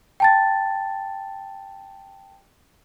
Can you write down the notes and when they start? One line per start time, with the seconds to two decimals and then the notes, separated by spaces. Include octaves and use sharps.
0.20 G5 A5 A6